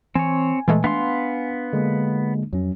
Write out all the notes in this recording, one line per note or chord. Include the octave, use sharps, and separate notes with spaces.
E3 C4 C#5 G#5
A#2 E3 G#3 A3
A3 B3 D4 F5 C6
D3 G#3 A#3
F2 F#3 C#4